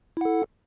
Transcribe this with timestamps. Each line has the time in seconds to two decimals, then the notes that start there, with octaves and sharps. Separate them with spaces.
0.17 E4
0.21 F#5
0.25 A4